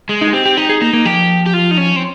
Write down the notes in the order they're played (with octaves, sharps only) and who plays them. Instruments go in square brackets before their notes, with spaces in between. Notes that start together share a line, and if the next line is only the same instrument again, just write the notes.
[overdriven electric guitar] G#3
[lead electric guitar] D#4
G#4
[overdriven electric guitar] C4 [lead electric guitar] G4
[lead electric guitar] G4
[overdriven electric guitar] D#4 [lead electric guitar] G4
[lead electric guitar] G#4
[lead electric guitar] A#3 [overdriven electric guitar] D#4
[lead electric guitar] A#3
[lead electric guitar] F3 [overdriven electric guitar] G4
[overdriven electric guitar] G4
F4
D#4
C#4
C4